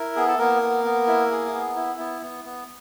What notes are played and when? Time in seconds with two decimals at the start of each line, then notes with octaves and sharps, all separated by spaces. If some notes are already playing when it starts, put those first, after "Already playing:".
Already playing: E4 A#4
0.16 B3 G#4
0.27 A4
0.38 A#3 B3 A#4
0.63 B3
0.85 B3
1.07 E4
1.31 G#4
1.54 B3
1.76 E4
1.99 B3
2.22 B3
2.45 B3